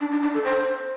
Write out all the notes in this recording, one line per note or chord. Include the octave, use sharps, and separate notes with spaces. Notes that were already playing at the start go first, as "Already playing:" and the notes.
D4
D4
D4
A4
C5